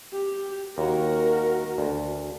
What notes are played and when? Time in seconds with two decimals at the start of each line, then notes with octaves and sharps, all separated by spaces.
0.13 G4
0.78 D#2 F#4 A#4
1.78 D2